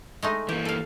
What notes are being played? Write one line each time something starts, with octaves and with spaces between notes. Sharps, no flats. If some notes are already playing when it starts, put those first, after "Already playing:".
G#3 A3 D#4
E3 A#3 G4
A4 F5